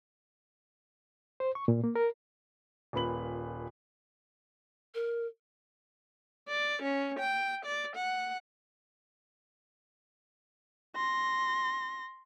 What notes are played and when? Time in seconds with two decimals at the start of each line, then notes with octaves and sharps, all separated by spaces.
1.40 C5
1.55 C#6
1.68 A#2
1.84 A#3
1.96 A#4
2.93 D#1 A#2 A#3 B4 B5 F#7
4.94 A#4
6.48 D5
6.83 C#4
7.19 G5
7.66 D5
7.96 F#5
10.96 C6 A#6